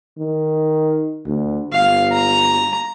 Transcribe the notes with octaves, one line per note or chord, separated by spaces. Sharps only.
D#3
D2
G1 F5
A#5